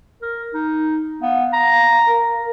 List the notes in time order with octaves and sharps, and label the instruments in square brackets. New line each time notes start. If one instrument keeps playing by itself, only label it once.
[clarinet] A#4
D#4
[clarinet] B3 [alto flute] F5
[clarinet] A#5
[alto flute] A#4